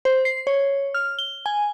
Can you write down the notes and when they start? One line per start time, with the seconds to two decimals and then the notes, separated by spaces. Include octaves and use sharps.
0.05 C5
0.25 C7
0.47 C#5
0.94 F6
1.19 G7
1.46 G#5